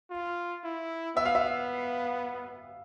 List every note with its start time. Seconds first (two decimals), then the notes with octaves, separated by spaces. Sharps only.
0.10 F4
0.63 E4
1.16 B3 E5
1.25 F5
1.35 E5